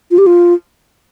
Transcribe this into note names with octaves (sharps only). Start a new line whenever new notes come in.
F4
G4
F4